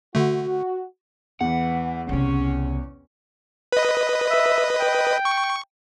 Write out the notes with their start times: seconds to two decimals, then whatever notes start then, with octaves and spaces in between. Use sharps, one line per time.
0.15 D3 A3 F#4
1.41 E2 E3 F#5
2.09 C2 C#3 C4 C#4
3.72 B4 D#5
4.30 E5
4.80 G5
5.25 C#6